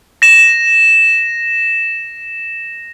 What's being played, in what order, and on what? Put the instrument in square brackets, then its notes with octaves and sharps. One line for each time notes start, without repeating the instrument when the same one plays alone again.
[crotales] A#6 E7